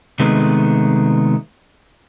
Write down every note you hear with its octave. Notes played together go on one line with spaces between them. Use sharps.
C3 D#3 G#3 A3 B3